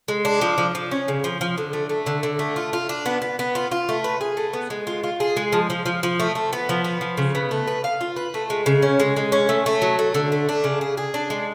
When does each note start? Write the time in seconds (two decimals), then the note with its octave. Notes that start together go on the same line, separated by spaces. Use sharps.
0.08 G#3
0.25 D4
0.41 F3
0.58 F3
0.75 F3
0.91 C#4
1.08 C#3
1.24 F3
1.41 F3
1.58 D3
1.73 A3
1.90 A3
2.06 D3
2.23 D3
2.39 A3
2.56 F4
2.73 F4
2.89 D4
3.06 B3
3.22 B3
3.39 B3
3.55 F4
3.71 F4
3.89 A3
4.04 B4
4.21 G#4
4.37 A3
4.53 B3
4.70 G#3
4.87 F4
5.04 F4
5.20 G#4
5.37 G#3
5.52 F3
5.70 F3
5.86 F3
6.03 F3
6.20 A3
6.35 A3
6.53 B3
6.69 F3
6.84 B3
7.01 F3
7.17 C#3
7.35 B3
7.51 A3
7.67 B4
7.84 F5
8.01 F4
8.16 B4
8.34 A3
8.50 G#3
8.66 C#3
8.82 C#4
9.00 G#3
9.17 G#3
9.32 C#4
9.49 A3
9.66 A3
9.82 F#3
9.99 A3
10.14 D3
10.32 A3
10.49 D4
10.64 C#3
10.81 G#4
10.97 G#4
11.14 D4
11.30 G#3